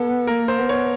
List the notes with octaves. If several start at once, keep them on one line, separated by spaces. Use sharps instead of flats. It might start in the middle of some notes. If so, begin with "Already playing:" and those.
Already playing: B3 A4
A#3 A#4
C5
B3
C#5